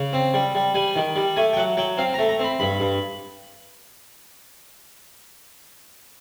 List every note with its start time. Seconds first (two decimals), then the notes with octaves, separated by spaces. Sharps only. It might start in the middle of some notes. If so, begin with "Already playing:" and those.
Already playing: C#3
0.13 C4
0.34 G3
0.55 G3
0.74 G3 G#5
0.96 D#3
1.16 G3
1.36 A3 G#5
1.53 G5
1.57 F#3 F#5
1.77 F#3 G5
1.97 C4 F5
2.14 A#5
2.19 A3
2.29 A#5
2.39 C4 B5
2.59 G2 B5
2.80 G2